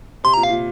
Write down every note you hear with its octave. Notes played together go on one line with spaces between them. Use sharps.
C3 C6
A#2 A#5
F5
A#2